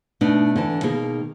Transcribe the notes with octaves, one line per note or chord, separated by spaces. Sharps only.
B2 A3 B3 D4 D#4
D3 E3 A5
B2 D#3 A#3 D#4 G#4